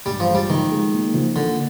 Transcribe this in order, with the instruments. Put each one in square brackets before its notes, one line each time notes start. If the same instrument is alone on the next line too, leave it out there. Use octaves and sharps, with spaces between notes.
[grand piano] G2 [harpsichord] G3
[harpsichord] F3
[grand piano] G#3
[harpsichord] G3
[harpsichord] D#3 [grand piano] F3
[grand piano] G#3
A#3
F3
[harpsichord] D3 [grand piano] A#3